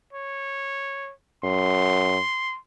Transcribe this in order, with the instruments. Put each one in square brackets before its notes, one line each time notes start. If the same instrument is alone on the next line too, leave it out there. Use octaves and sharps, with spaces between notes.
[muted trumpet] C#5
[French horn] F#2 [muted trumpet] C6